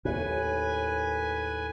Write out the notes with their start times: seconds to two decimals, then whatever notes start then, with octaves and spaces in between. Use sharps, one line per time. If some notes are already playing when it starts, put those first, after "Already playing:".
0.05 D#2 A2 B4 G#5